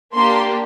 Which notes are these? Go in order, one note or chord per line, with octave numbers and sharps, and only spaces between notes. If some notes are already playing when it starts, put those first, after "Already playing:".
A#3 D4 G4 C6